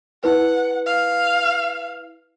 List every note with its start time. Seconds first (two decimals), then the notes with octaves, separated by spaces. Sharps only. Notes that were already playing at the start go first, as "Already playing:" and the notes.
0.24 E4 B4 F#5
0.86 F5